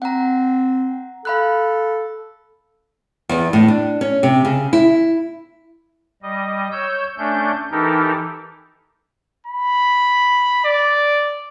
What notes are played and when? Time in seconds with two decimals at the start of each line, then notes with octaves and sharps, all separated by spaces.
0.02 C4 F#5 A#5
1.25 A4 F5 B5 F#6
3.29 E2
3.53 A2
3.68 D4
4.01 C#4
4.23 C3
4.45 C#3
4.73 E4
6.22 G3 D#5
6.72 C#5 E6 G6
7.18 A3 C#4 D4 G6
7.72 E3 D#4 G4 A4 A#4
9.47 B5
10.65 D5